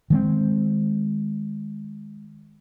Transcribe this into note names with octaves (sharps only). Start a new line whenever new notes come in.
D#3 G#3 C4